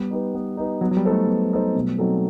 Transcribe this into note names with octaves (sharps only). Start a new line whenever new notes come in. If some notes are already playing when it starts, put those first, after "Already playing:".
Already playing: G3 B3
D#4 G4 B4
B3
D#4 G4 B4
F#3 B3
F#3
G3
D#4 A4 C5
A3
B3
D#4 A4 C5
B2
F#3 C4 D#4 A4